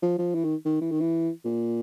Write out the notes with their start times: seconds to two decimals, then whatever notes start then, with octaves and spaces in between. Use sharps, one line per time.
0.03 F3
0.18 F3
0.35 E3
0.44 D#3
0.66 D#3
0.81 E3
0.91 D#3
1.01 E3
1.45 A#2